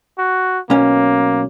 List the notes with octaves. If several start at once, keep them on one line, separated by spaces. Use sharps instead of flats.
F#4
B1 A#3 C#4